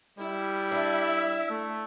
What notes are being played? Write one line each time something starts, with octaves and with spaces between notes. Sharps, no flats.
G3 E4
D4 E5
A3